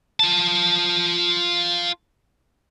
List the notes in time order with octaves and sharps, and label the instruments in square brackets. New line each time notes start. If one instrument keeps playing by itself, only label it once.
[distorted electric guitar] F4 A5